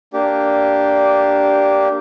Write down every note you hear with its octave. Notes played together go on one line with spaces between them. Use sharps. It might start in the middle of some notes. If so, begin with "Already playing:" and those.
A#3 D4 G4